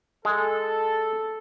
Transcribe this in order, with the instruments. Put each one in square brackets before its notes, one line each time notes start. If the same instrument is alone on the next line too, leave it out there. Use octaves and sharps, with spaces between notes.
[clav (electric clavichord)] G#3 [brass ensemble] A4